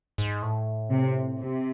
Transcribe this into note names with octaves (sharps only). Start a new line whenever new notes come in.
G#2
A2
C3
C3